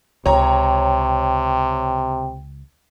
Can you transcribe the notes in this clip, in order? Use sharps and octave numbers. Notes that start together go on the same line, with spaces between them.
C#2 C3 C#5 G5 A#5